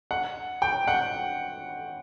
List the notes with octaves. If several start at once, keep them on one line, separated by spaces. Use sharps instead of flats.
F#5
G5
F#5